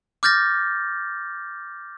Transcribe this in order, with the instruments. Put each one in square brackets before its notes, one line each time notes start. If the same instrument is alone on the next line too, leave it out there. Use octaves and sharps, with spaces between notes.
[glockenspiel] D6 F6 G6 A6 A#6